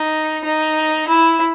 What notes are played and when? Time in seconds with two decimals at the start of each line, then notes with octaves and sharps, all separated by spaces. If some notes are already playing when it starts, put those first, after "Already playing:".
Already playing: D#4
0.44 D#4
1.08 E4